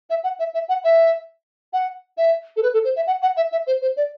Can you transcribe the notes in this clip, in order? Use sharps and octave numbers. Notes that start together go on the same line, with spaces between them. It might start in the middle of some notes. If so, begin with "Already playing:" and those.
E5
F#5
E5
E5
F#5
E5
F#5
E5
A4
B4
A4
C5
E5
F#5
F#5
E5
E5
C5
C5
D5